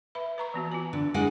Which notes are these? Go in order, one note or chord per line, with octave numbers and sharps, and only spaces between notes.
B4 E5 B5
B4 A#5 C#6
E3 B3 F#4
F4 G#5
D3
G#3 D4 E4 F#5